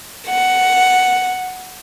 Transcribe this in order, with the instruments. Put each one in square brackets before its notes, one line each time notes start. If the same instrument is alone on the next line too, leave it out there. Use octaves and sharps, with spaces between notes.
[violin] F#5